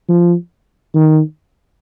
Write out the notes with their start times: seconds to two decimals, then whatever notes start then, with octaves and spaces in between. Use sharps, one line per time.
0.09 F3
0.95 D#3